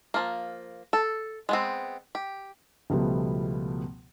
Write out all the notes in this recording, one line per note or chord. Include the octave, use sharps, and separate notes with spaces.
F3 A#3
A4
G#3 B3 C4
G4
C#2 B2 F3 G3 A3 B3